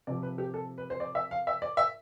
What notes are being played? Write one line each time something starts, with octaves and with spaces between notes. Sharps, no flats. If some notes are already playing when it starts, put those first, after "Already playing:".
C3 F3 D5
B4
G4
A4
B4
C5
D5
E5
F5
E5
D5
E5